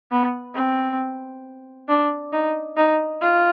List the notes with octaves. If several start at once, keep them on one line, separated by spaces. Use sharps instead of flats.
B3
C4
D4
D#4
D#4
F4